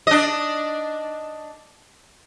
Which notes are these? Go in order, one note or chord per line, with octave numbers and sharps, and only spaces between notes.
D4 D#5